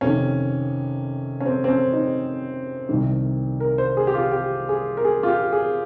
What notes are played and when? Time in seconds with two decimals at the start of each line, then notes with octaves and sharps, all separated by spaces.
0.01 F2 C3 D#3 C#4
1.40 C#4
1.46 C4
1.64 C4
1.68 C#4
1.93 D#4
2.89 C2 C3 D#3
3.60 A#4
3.78 C5
3.97 G#4
4.07 G4
4.14 F4
4.32 G4
4.69 G#4
4.97 A#4
5.05 G#4
5.23 F4
5.28 G4
5.52 G#4